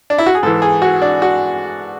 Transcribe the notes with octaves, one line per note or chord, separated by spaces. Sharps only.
D4
E4
F#4
G#4
G#2 E3 A4
G#4
F#4
D4
F#4